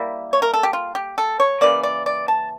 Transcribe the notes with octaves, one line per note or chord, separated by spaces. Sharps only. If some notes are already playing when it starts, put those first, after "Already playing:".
Already playing: G3 A#3 E4
C#5
A#4
A4
G4
F4
G4
A4
C#5
C#3 E3 A#3 D5
D5
D5
A5